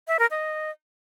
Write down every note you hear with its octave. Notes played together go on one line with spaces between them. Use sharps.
E5
A#4
D#5